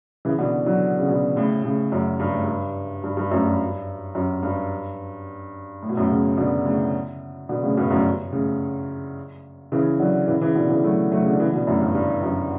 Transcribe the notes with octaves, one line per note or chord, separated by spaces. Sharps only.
C#3 E3
B2 D3
D3 F#3
C#3
B2 D3
A2 C#3
A2 C#3
F#2 A2
G2
A2
G2
G2
G2
F#2 A2
G2
F#2
G2
A2
B2
F#2 A2
A2 C#3
B2 D3
A2 C#3
B2 D3
A2 C#3
G2 B2
F#2 A2
A2 C#3
C#3 E3
D3 F#3
C#3 E3
C#3 E3
B2 D3
C#3 E3
F#3 A3
F#3 A3
C#3
D3
C#3 E3
B2 D3
F#2 A2
G2
G2
F#2